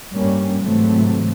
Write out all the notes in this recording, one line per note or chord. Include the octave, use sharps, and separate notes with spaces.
G2 G3 A#3 C#4
G#2 C3 E3 F#3 A3 C4